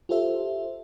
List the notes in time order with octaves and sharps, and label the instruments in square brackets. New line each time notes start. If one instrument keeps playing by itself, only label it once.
[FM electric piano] F4 G4 A4 C5 E5